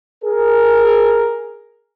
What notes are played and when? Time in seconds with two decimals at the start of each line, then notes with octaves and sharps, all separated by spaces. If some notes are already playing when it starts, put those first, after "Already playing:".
0.25 G#4 A#4